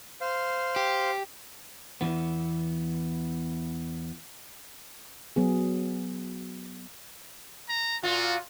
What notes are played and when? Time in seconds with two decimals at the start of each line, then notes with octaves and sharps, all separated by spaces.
0.21 C5 F5
0.76 G4
2.01 E2 E3 B3
5.36 F#3 B3 G#4
7.69 A#5
8.03 A#2 F4 F#4